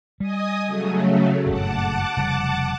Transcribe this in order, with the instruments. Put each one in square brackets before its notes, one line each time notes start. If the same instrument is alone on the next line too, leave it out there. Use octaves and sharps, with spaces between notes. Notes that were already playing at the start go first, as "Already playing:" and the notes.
[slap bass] G3 [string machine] D#5 G#5 D#6
[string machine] C#3 F#3 A3
[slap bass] F#1 G2 A#2 [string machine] F#5 A5 D6
[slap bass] F1 C#3 G3